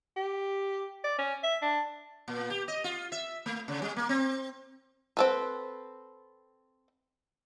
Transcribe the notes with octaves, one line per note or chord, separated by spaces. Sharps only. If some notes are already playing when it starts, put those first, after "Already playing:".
G4
D5
C#4
E5
D4
A#2
G4
D#5
F4
E5
A3
C#3
G3
A#3
C4
C4 A4 B4